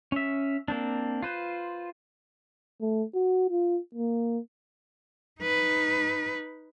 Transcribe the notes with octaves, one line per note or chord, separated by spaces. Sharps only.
C#4 E5
A#3 C4 D4
F4 B4 C5
A3
F#4
F4
A#3
D#4 B4